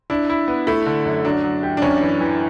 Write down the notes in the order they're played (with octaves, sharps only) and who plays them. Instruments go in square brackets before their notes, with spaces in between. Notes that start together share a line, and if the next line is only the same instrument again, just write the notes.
[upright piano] D4 [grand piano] E4
[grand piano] E4
B3
[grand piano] A3 [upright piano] E4
[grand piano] D3
F#2
[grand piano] F#3 [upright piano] D4
[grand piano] F#3
G4
[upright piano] D4
[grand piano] F#2 [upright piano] C#4
[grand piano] E3
E3